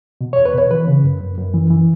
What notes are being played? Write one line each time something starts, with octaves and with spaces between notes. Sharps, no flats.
B2
E2 C#5
B4
B2 C#5
E3 B4
C#3
F#2
F#2
F#2
E3
E3